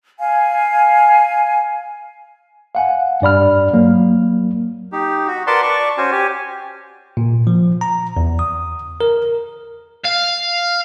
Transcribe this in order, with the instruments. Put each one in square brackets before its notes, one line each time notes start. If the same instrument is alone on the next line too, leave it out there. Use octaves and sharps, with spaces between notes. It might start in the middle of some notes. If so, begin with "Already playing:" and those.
[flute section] F5 G#5
[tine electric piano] F5 F#5 G#5
G2 D5 B5 F6
F#3 A#3
[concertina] D#4 G4
F#4
A#4 B4 D5 F#5 A5 C6
D5 A5 C#6
C#4 F#4 C5 G#5
G4 G#5
[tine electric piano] A#2
F3
A#5
E2
D#6
A#4
[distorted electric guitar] F5